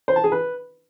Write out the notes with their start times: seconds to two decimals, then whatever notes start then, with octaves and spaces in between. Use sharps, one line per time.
0.08 C5
0.16 A5
0.24 G#4
0.32 B4